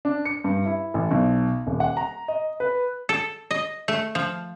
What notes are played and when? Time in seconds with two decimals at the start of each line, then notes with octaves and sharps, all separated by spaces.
0.05 D4
0.25 C#7
0.44 G2
0.66 E4
0.94 A1
1.11 B1
1.67 D#1
1.80 F#5
1.97 A#5
2.28 D#5
2.60 B4
3.09 A4
3.51 D#5
3.88 A3
4.15 F3